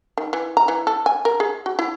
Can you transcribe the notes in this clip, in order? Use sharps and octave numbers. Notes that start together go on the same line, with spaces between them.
D#3
E3
A#5
E3
A4
G#5
A#4
G#4
F#4
E4